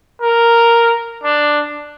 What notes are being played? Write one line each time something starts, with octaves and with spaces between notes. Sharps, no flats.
A#4
D4